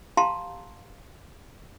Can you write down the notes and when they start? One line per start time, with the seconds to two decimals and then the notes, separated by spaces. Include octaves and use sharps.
0.17 G4 F5 A5 A#5 C6